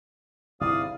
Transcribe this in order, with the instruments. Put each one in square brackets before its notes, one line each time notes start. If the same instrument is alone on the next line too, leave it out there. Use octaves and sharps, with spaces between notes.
[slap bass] G1 C2 [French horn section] G#2 D3 E4 [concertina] D5 F5 [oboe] D#6